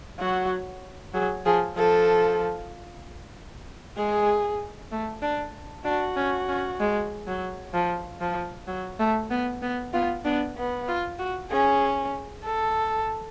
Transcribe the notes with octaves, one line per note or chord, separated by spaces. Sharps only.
F#3 F#4
F#3 G#4
F3 G#4
F3 A4
G#3 G#4
A3
D4
D4 F#4
C#4
C#4
G#3
F#3
F3
F3
F#3
A3
B3
B3
B3 F4
B3 D4
B3
F4
F#4
C#4 G#4
A4